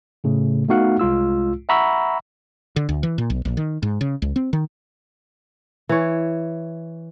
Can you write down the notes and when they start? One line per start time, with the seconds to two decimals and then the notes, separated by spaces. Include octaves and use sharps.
0.24 A2 C#3 A3
0.68 A3 B3 D#4 F#4 F5 F#5
0.99 C2 G#3 F4 E6
1.69 E5 F#5 A#5 B5 C#6 E6
2.76 D3
2.89 D2
3.03 E3
3.18 A#2
3.30 B1
3.45 A#1
3.57 D#3
3.83 G#2
4.01 C#3
4.22 C#2
4.36 C4
4.53 D#3
5.89 E3 C#5